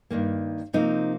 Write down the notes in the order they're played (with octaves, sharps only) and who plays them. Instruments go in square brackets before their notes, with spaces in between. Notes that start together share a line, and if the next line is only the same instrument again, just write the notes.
[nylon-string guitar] G2 D#3 A#3
C3 F3 A#3 C4 D#4